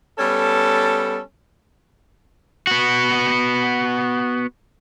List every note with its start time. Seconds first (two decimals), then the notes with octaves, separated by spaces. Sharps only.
0.18 G3 B3 C#4 A4
2.67 B3 F#4